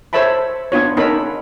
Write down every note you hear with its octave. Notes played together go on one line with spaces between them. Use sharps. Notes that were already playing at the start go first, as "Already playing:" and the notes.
A4 C5 C#5 E5 A5 B5
B3 D4 F4 C#5
B3 C#4 D#4 A4 A#4 B5